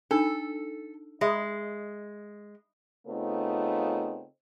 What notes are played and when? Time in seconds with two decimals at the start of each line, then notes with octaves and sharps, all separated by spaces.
0.11 D4 D#4 A4
1.21 G#3 E5
3.07 C#3 A3 B3 C4 D#4 F4